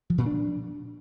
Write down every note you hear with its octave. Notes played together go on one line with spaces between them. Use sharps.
F3
A#2
D4